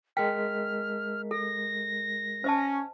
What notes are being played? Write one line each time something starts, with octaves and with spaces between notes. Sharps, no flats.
G#3 A#4 G5 F6 B6
A4 A#6
C#4 C5 D#5 A5